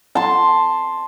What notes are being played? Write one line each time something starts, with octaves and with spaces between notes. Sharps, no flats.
A5 C6